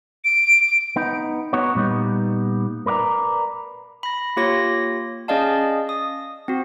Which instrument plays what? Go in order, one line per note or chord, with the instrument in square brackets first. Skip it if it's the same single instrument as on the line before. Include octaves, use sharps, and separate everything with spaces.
[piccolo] D7
[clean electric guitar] B3 D#4
B3 D#4 F#4 C#5
A#2 G3 B3 D#4
A#4 B4 D5 F5 A#5
[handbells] B5 A#6
A#3 F4 G4 C#5 A#6
C#4 G#4 D5 D#5 F5 A5
D#6
C4 F#4